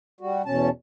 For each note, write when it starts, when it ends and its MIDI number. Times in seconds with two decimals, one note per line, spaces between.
0.21 0.42 55
0.21 0.42 66
0.46 0.69 40
0.46 0.69 47
0.46 0.69 61
0.46 0.69 81